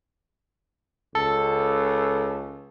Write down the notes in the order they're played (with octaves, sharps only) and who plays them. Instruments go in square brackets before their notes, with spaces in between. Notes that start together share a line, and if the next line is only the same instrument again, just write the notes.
[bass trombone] C#2 [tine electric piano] A4